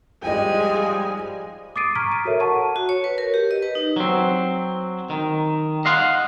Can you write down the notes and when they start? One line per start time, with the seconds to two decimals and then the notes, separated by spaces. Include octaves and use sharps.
0.23 G#2 F3 G3 G#3 D#5 G5 G#5
1.76 D6 D#6 A6 C7 D7 D#7
1.95 A#5 C#6 F6 G#6 B6 D7
2.12 D#7
2.25 F#4 A4 A#4 C#5 E5
2.40 F#5 A5 C#6 D#7
2.76 F#4
2.89 C#5
3.04 B4
3.18 A#4
3.34 G4
3.51 D#5
3.63 B4
3.75 D#4
3.96 F#3 C4
5.10 D#3
5.85 D#5 F5 F#5 C6